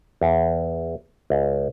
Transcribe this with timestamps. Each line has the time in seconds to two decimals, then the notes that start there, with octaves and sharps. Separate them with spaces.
0.21 E2
1.30 C#2